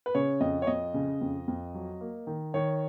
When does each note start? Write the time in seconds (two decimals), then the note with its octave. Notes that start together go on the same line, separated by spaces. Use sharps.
0.06 B4
0.15 C#3 C#5
0.40 F2 D#5
0.62 C#5
0.67 F2 D#5
0.94 C#3
1.21 F2
1.48 F2
1.74 F#3
2.01 A#3
2.27 D#3
2.54 D#3 C#5